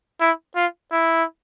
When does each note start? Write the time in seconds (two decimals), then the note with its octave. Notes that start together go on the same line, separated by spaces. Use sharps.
0.21 E4
0.56 F4
0.92 E4